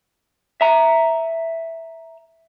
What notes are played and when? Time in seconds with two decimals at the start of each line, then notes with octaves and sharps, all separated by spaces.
0.61 E5 A#5